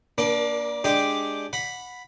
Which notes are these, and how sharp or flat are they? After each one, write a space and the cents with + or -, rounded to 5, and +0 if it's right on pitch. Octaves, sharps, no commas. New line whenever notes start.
A#3 +15 D4 -10 A#4 +45
G#3 +0 D4 +0 G4 +0
F#5 -20 B5 +0